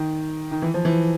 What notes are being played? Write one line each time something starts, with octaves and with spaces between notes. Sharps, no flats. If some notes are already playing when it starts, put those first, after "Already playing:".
Already playing: D#3
D#3
E3
F3
E3